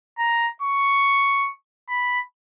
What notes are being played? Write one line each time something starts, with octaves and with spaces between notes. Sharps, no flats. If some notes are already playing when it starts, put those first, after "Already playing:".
A#5
C#6
B5